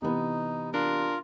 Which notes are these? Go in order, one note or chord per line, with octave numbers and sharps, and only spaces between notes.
C3 E3 B3 D#4
D4 F4 A#4